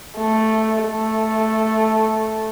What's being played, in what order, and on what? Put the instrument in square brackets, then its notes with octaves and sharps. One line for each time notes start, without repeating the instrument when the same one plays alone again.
[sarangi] A3
A3